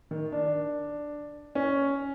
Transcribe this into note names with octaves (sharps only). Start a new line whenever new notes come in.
D#3
D4
C#4